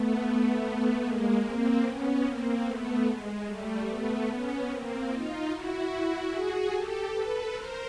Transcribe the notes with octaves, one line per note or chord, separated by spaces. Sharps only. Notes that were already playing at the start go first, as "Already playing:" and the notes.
Already playing: A3 B3
G#3 A#3
A#3 C4
B3 C#4
A#3 C4
A3 B3
G#3
G3 A3
A3 B3
B3 C#4
A#3 C4
D#4 F4
E4 F#4
F#4 G#4
G4 A4
A4 B4
A#4 C5